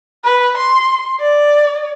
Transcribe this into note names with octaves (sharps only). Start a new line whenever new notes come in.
B4
C6
D5